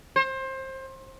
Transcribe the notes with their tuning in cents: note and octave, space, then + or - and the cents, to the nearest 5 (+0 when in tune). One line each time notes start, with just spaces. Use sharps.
C5 +25